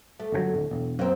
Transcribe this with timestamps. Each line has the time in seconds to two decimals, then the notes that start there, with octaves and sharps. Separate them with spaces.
0.20 A3
0.32 G1 D3 F#3
0.53 D1
0.71 E1
0.99 F#2 A#3 C4